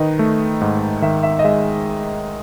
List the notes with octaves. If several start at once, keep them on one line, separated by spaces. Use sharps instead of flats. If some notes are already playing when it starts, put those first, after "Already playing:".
Already playing: D#3 D#4 B4 D#5
A3
G#2
D#3 E5
E5
D#5
G#3 E5